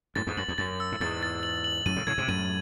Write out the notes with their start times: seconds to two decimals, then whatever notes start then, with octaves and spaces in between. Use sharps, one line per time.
0.15 F#2 A2 A6
0.27 E2 G#2
0.37 F#2 F#7
0.48 E2
0.58 F#2 A6
0.80 E6
0.92 A2
1.00 E2 G#2 A6
1.23 A6
1.43 F#7
1.64 F#7
1.86 F#2 A2 D#7
1.96 A2 C#3
2.07 A2 C#3 G#6
2.18 G#2 C3
2.28 F#2 A2 D#7